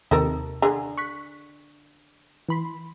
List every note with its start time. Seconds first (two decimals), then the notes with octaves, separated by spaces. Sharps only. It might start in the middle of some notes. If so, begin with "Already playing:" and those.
0.11 D#2 C3 D#4 A4 A#4
0.62 D3 G#4 A#5
0.98 C#6 F#6 B6
2.48 E3 B5 C6